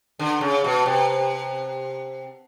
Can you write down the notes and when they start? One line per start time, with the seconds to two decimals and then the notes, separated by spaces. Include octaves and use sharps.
0.19 D3
0.41 C#3
0.64 B2
0.86 C3